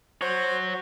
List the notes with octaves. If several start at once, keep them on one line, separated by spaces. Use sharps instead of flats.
F#4 C5 C#5